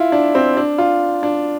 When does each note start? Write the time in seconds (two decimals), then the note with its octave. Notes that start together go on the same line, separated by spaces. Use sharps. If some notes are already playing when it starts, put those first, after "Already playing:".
Already playing: E4 F4
0.12 D4
0.35 C4
0.57 D4
0.78 F4
1.23 D4